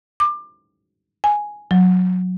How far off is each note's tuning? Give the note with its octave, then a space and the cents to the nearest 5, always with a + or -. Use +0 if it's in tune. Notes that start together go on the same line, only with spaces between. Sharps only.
D6 +25
G#5 +0
F#3 -15